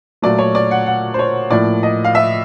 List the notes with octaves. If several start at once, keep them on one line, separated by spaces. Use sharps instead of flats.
A#2 F#3 A3 D5
C#5
D5
F#5
F#5
C5
C#5
A2 F3 A#3 D5
D#5
F5
E5